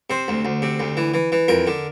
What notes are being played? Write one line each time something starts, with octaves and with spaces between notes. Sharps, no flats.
C3 C5
D2
D2
C3
D2
E3
E3
E3
F2 A#4
D3